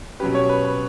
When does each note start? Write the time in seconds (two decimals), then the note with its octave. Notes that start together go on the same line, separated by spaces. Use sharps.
0.20 B2 F#3 C#4 G4 B4
0.35 C#5
0.49 B4
0.65 B4